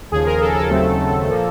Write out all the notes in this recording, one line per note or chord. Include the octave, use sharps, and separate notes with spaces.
D#2 C#3 F3 G#4
A#4
A4
A4
D#2 C#3 F#3 A3 C4
A#2 F3 A#3